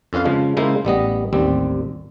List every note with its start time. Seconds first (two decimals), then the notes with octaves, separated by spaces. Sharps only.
0.13 F2 C#4 F4 B4 F5
0.25 C#3 F3 G#3
0.57 C#3 G#3 A#3 E4 C5
0.85 A1 G3 B3 D#5
1.33 A1 D#2 G3 C4